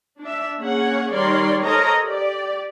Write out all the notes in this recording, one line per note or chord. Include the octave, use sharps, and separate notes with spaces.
D4 E5
A#3 C#4 G#4 C#5 F#5
D#3 G3 A#4 C#5 D5 C6
A4 A#4 C5 C#5 D#5 A#5
G4 D5